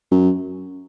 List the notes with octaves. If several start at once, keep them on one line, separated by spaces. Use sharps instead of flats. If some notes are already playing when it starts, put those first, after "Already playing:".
F#2